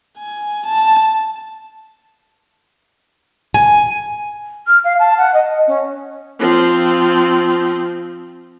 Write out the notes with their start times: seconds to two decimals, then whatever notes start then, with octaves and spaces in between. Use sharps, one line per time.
0.18 G#5
0.65 A5
3.54 G#5
4.66 F6
4.84 F5
4.99 A5
5.18 F#5
5.33 D#5
5.67 C#4
6.40 F3 C4